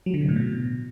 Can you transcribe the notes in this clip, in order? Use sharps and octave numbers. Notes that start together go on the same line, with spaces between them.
F#3
D3
C3
A2
B2